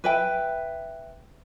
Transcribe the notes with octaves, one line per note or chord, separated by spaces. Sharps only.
B4 E5 G5